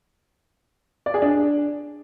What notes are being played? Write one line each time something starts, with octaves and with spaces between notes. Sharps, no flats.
D5
G#4
D4